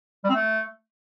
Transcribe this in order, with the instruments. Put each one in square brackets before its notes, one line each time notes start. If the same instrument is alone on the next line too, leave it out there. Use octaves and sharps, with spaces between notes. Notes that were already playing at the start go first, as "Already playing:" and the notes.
[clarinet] G3
C4
A3